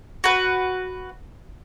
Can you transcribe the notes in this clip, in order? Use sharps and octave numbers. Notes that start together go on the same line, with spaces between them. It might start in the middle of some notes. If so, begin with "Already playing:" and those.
F#4 B4